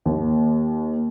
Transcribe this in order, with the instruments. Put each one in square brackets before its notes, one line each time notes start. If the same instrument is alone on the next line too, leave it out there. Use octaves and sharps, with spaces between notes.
[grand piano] D#2